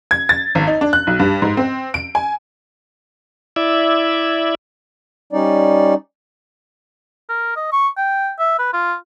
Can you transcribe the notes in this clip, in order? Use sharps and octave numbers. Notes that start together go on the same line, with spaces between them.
G#6
A6
G#1
D#4
D4
F#6
B1
G2
G#2
C4
D7
G#5
E4 D5 E5
G3 C#4 D#4 D5
A#4
D#5
C#6
G5
E5
B4
F4